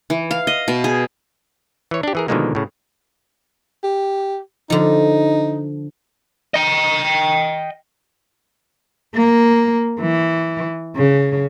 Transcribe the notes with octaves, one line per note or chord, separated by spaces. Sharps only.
E3
F5
D#5
B2
G#4
E3 C#5
D4 G4
E3 G#4 A#4
B2 D3 D#3 F3 G#3 A#3
A2 C#3
G4
D3 F3 D#4
D#5 G5
A#3
E3
C#3